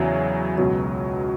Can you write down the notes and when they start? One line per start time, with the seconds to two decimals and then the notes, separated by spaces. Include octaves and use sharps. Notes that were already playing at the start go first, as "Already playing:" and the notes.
Already playing: E2 C#3 F#3 E5 G#5
0.58 C#2 B2 F#3